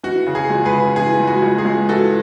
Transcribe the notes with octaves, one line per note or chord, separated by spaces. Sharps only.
E3 F#4
C#3
G#4
C#2
G#4 B4
C#3
E3 G#4
C#2
F#4
C#2
G#4
C#2
E3 F#4 A4